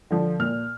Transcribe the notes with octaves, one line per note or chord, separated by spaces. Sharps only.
D3 F3
A#2 F6